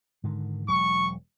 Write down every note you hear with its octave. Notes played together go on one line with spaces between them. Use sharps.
G#2 D3 D#3
E1 F#3 G#3 C#6